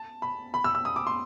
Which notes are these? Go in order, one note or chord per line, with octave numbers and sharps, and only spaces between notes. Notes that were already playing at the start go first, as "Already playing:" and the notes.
Already playing: A5
B5
B5
E6
E6
D#6
D6
C6